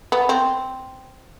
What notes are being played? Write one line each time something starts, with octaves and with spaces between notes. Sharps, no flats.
B3
C4